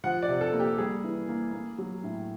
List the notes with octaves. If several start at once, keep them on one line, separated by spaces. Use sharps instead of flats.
F3 F#5
D5
C3
A4
A#3
G4
G3 G#4
E3
A#3
A#3
F#3
A2